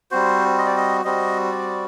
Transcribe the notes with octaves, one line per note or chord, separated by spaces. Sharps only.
G3 C4 F#4 C5
D#5
D5
D#5
G3 C4 F#4 D#5
D5